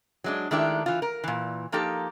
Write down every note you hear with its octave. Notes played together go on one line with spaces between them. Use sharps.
F#3 G#3 D4
D#3 G#3 A3 D4 E4 G4
E3 F4
A#4
A#2 E3
F3 A#3 D#4 G4 A4